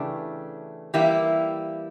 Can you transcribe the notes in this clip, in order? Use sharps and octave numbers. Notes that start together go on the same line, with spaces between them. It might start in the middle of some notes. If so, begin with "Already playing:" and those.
Already playing: C#3 E3 A3 D4 G4
E3 G3 A#3 E4 G4